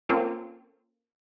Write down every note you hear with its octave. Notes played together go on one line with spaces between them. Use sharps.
A#3 C4 C#4 F4 A4